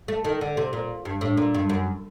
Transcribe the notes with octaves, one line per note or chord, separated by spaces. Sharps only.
A3
D#3
D3
C3
A#2
G2
A2
A#2
G2
F#2